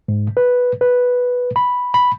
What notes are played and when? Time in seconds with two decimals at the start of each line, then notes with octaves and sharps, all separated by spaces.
0.08 G#2
0.37 B4
0.81 B4
1.56 B5
1.94 B5